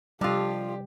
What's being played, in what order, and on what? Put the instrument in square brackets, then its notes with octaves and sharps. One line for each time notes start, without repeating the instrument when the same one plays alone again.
[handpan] C3 G3 [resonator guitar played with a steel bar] F3 F4 [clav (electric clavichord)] D4 A4 D#5 [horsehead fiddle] G4